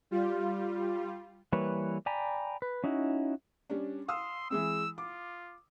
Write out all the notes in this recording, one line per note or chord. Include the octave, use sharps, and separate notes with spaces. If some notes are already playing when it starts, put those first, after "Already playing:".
G3 F4
E3 G3 A#3 B4 C#5
D5 G5 G#5 A#5 B5
B4
C#4 D#4 E4 F#4
G3 C#4 D4
F5 C6 D#6 E6
E3 G#3 C4 E6
F4 D6